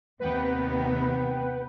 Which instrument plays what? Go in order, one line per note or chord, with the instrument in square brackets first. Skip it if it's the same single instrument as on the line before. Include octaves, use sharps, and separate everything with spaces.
[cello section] D#2 C3 B3 [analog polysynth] B4 F#5 G5